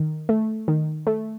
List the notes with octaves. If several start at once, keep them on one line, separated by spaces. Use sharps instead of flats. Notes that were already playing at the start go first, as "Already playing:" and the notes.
Already playing: D#3
A3
D#3
A3